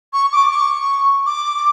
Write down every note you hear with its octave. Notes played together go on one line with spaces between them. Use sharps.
C#6
D6
C#6
D6